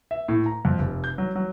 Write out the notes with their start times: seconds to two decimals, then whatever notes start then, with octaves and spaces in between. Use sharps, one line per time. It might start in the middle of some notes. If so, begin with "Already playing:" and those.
0.11 E5
0.28 A2
0.46 A#5
0.65 F2
0.79 F1
1.04 G6
1.18 F#3
1.36 F#3